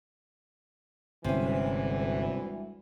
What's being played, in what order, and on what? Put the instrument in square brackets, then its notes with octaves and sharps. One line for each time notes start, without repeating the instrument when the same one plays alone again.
[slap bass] G1 [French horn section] D2 E3 [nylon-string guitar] C3 C#4 [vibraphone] G3 G#3 E5